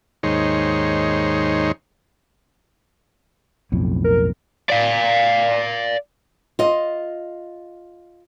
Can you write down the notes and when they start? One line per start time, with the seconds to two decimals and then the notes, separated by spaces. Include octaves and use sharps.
0.23 D#2 G#2 D#4 C5 C#5
3.72 B1 F2 A2
4.04 A#4
4.70 D5 F5
6.59 F4 D#5